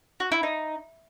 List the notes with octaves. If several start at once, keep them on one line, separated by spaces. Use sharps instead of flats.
F#4
E4
D#4